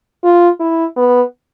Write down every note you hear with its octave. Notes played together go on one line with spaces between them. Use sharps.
F4
E4
B3